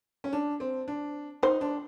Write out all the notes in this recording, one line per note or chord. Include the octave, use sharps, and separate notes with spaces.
C#4
D4
C4
D4
D#4 C5
D4